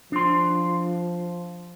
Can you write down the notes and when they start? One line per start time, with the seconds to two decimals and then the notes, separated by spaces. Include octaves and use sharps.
0.12 F3 D4 C6